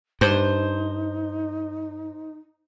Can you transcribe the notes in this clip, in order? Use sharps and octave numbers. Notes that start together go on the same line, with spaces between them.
G2 D#4 C5